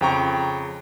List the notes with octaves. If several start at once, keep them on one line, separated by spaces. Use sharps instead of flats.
F2 C#3 G5 A#5 C#6